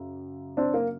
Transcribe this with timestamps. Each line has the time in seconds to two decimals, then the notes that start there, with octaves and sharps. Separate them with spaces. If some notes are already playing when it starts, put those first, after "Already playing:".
Already playing: F#2 C#3
0.57 C4 D4
0.74 A#3